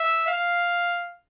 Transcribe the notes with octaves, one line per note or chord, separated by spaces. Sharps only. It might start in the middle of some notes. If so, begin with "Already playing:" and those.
Already playing: E5
F5